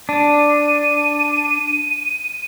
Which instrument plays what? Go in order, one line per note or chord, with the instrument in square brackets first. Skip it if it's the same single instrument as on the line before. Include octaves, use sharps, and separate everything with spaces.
[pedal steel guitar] D4 [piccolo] D#7